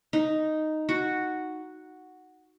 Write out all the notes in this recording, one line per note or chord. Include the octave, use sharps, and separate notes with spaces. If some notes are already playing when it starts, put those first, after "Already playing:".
D#4
F#4